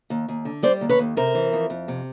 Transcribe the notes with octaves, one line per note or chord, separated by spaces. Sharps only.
D#2
D#2
D3
G3 C5 D5
D#2
B4 C#5
D#2
C3 A#4 C5
E3
F2
F2
C3